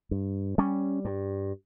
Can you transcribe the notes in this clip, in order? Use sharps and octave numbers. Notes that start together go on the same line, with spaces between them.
G2
G3 C#4
G2